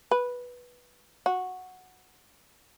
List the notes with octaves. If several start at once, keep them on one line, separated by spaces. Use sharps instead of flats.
B4
F#4